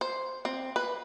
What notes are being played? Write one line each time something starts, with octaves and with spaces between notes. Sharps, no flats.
C5
C4
B4